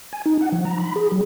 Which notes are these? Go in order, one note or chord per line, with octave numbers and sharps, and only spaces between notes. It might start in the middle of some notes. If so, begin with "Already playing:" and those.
G#5
D#4
F#5
F3
A#5
B5
G#4
F#3